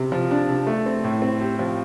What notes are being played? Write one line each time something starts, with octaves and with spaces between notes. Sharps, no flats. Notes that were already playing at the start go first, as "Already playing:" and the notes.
Already playing: C3
F3
D4
C3
A3
C4
A2
C4
G4
F3